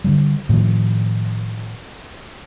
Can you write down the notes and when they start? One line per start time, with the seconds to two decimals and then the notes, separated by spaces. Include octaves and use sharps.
0.04 D3 D#3 G3
0.49 A2 D#3 F3